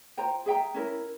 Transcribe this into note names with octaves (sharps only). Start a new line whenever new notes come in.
F4 C5 G5 A#5
G#4 E5 G5 A#5
C#4 E4 A#4